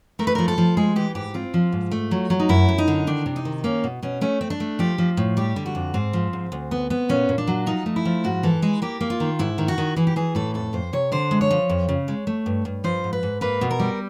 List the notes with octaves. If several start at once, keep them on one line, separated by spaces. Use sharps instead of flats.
A3 A#4
B4
F3 A#4
A4
F3
G#3 G#4
E3 G4
G#2 G4
C4 F4
F3
G#2
A3
F#3
F#3
D#4
F#2 E4
F#2
D#4
D3
D#3 D4
C3
D#4
D#3
A#3 C#4
B2
B2 C#4
A3 C#4
C4
D4
A3
F3 G4
F3
A2
G3 G4
D3
F#4
F2
G#2 C4
F3
G#2
D2
B3
B3
A#2 C#4
A#2
D4
F#3
F3 D#4
A3
E4
F3
G#2 F#4
E3 A4
G#3 G#4
A#3 G4
A#3
F4
D#3
G#2 E4
D#3
F#4
D#3
E3 G#4
G4
E3 G#4
A2 A4
F2 A4
F2 C5
C3 C#5
D3 C5
G#3
C#5
F3
F2
C#3
G#3
A3
G2
G2
F3 C5
G#2
B4
G#2
A#3 B4
B2
A#4
G3